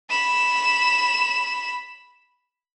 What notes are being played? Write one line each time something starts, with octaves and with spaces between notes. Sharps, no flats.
B5 E7